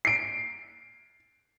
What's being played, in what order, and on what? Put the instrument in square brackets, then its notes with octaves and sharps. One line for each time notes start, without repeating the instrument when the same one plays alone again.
[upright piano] C7 D7